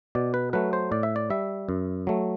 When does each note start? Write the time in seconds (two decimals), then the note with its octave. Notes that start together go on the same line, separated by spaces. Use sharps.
0.15 B2 D5
0.34 B4
0.53 F#3 A3 B4
0.73 C5
0.92 A2 D5
1.03 E5
1.16 D5
1.30 G3 E5
1.69 F#2
2.07 F#3 A3